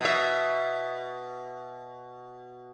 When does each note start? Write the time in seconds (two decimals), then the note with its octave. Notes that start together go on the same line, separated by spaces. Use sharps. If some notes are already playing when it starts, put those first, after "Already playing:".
0.01 B2 E5